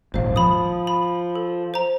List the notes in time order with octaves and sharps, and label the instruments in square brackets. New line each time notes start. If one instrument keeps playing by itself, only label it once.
[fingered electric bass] D#1 G#1 [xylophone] C5 F5
[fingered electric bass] F3 [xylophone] B5 D#6
[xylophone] B5
A4
C5 A#5